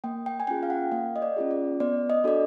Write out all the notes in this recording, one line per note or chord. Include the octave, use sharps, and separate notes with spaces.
A#3 G5
G5
G#5
C#4 F4 G#4 G5
F5
F#5
A#3 F5
D#5
D5
C#4 F4 G#4
D5
B3 D5
D#5
D4 F#4 A4 D5